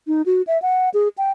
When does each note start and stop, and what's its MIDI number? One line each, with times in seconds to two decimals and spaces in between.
0.07 0.22 63
0.26 0.42 66
0.47 0.60 76
0.62 0.89 78
0.94 1.08 68
1.18 1.31 79